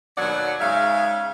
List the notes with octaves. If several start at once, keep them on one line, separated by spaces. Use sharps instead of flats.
D#2 B2 F#3 D5 F#5
G#2 C#3 G#3 E5 F5